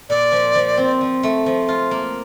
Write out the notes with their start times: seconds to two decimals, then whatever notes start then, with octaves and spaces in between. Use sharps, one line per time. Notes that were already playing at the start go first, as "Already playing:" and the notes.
0.09 A#2 D5
0.32 F3
0.55 F3
0.77 C4
1.01 F3
1.23 A3
1.46 F3
1.68 F4
1.91 A#3